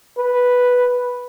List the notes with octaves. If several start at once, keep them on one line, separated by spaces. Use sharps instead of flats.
B4